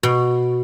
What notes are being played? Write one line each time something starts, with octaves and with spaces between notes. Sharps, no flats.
B2